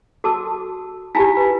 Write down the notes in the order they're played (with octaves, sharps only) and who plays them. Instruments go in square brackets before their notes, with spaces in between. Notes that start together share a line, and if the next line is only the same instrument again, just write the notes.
[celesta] F#4 A5 E6 [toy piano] A4 D6
[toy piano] E4 F4 G4 [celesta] G#5 A5 B6
[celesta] B4